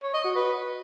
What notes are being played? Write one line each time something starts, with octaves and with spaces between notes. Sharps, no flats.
C#5
D#5
F#4
B4